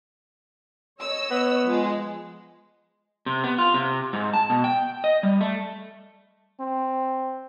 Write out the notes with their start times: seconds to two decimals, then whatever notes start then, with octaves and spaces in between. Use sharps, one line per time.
1.00 C#5 D#5 E6
1.31 B3
1.64 F3 G#3
3.26 C3
3.44 B3
3.58 F4
3.74 C3
4.13 G#2
4.33 A5
4.50 B2
4.64 G5
5.04 D#5
5.23 G3
5.41 A3
6.60 C4